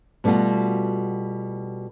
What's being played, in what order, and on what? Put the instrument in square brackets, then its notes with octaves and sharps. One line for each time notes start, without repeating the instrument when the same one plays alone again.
[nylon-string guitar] B2 G3 A3 F4 F#4